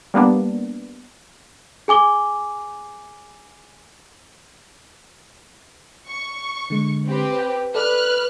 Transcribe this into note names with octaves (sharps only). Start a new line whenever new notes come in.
G3 A#3 B3 D4
G#4 G#5 D6 G7
C#6
D3 G#3
C4 G4 B4
G5
A4 B4 D5 F6 F#6